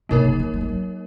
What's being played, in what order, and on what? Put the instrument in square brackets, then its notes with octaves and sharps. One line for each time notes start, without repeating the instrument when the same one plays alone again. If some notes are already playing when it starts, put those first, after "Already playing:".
[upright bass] B2 [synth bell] A#3 D#4 A#4 C#5
[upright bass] C#3
F3
D#3
F#3
G#3
F#3